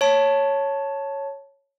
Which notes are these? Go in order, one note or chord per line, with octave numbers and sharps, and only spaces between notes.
C#5 A5